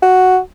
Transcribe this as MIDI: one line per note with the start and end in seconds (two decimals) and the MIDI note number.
0.02 0.39 66